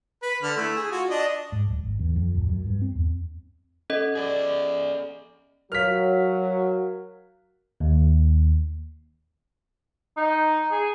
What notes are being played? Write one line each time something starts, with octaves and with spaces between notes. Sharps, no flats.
B4
D3 F6
A3 E4
G#4
F4 F#4
D4 D#5
G#2
D1
G#1
E2
F2
D1
F#2
G2
C4
E2
C#4 A4 D#5
G#4 D5
F#3 F#4 A#4 C#5 F5 F6 B6
D#2
D#4
G#4